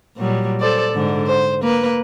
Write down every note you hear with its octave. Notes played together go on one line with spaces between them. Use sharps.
A#2 F#3 G3
A4 C5 D5
G#2 D3
C5
A#3 B4